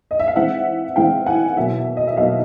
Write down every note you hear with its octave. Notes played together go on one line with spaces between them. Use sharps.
D#5
E5
F5
E3 G#3 C4 E5 F#5
E3 G#3 C4 F5 G5
F#5 G#5
B2 F#3 A#3 E5
D#5
E5
B2 F#3 A#3 D#5 F5